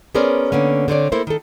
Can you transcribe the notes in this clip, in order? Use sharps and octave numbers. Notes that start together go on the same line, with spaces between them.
B3 C#4 G#4 A#4 C5 D5
D3 A#3 B3 C#4
D3 C4 C#5 D5
A#3 E4 A4 A#4 C5
D#3 A4